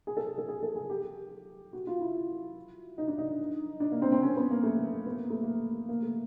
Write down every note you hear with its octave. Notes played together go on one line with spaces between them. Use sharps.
G#4
A4
A4
G#4
A4
G#4
G4
F#4
F4
E4
D#4
D4
D#4
D4
A#3
C4
C4
C#4
B3
A#3
A3
B3
A#3
A3
A#3
A#3
A3